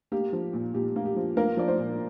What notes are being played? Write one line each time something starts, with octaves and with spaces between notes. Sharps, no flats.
A#3 G4
F3
A#2
A#2 G4
A#3
G4
F3
A#3 A#4
F3 D5
C5
A#2